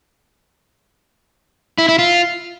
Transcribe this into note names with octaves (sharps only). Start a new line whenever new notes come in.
E4
E4
F4